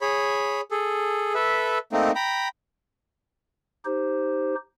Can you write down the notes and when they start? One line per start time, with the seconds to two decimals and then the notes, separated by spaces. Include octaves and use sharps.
0.01 G#4 C#5 B5
0.71 G#4 A4
1.34 A4 B4 E5
1.92 A3 A#3 C4 D#4
2.15 G5 A#5 B5
3.85 D#4 G4 C5